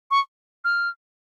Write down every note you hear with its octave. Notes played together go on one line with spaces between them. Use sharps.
C#6
F6